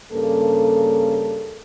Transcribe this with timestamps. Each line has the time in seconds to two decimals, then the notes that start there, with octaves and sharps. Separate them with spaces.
0.12 G2 C#3 A#3 A4